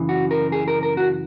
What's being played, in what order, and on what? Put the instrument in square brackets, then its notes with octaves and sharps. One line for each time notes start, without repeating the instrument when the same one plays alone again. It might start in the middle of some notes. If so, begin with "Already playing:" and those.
Already playing: [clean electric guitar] F#2 C#3 E3
F#4
A#4
G#4
A#4
A#4
F#4